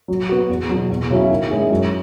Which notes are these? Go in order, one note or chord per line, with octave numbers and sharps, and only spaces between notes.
F#3
B3 F#4
E2
B2 F#3
E2
C#3 F#3 C#4 E4
D#3
G#3 C#4 E4 G#4
F#2